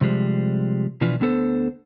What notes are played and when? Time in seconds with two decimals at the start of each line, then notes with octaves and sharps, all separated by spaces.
0.01 C3 F3 G3 G#3
1.01 B2 E3 F3 D4 F4 B4
1.20 D2 D3 B3 A4 C5